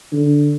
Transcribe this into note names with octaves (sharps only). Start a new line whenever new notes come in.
D3